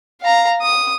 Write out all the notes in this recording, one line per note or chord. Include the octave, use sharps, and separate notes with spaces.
F5 A#5
D#6